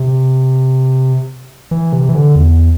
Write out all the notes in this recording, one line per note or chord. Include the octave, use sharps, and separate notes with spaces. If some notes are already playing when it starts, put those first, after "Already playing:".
Already playing: C3
E3
C3
E3
D3
E2